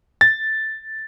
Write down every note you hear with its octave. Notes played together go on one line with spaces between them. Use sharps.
A6